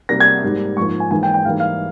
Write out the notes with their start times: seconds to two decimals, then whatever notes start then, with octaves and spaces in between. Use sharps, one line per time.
0.09 C3 G3 A#3 A#6
0.20 G#6
0.43 G#2 G3 A#3
0.77 G#2 F3 A#3 C#6
1.00 G#5
1.11 G#2 E3 A#3 G#5
1.23 G5
1.34 G5
1.45 G#2 E3 G3 A#3 F5
1.60 F5